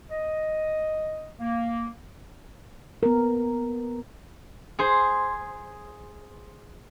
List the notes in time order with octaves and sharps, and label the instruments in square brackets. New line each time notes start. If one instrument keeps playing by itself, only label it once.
[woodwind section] D#5
A#3
[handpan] B3 A#4
[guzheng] G#4 C5